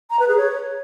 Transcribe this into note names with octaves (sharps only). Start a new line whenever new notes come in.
A#5
B4
G#4
C#5